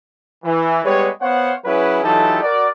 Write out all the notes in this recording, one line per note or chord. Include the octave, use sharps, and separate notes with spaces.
E3
G3 G#3 B3 G4 B4 C#5
B3 C5 C#5 F5 F#5
F#3 C#4 E4 G#4 B4
E3 F#3 D#4 F4 G4 A4
F#4 A#4 D5